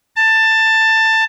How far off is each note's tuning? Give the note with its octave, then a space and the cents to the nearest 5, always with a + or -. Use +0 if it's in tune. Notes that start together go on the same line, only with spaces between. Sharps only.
A5 +15